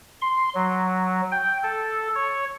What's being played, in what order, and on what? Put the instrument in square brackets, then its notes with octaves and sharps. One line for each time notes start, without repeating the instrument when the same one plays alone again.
[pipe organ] C6
F#3
G5
A4
C#5